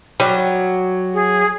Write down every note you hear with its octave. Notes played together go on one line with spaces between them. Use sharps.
F#3 G3
G#4